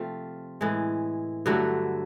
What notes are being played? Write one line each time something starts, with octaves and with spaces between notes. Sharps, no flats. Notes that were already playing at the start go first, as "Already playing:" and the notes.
Already playing: C3 F3 A3 C4 F4
A2 E3 G#3
G2 D3 F#3 A3